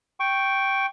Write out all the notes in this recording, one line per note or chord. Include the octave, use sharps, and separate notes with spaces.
G5 C#6